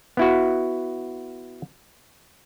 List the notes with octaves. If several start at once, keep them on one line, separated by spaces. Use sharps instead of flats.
B3 E4 F#4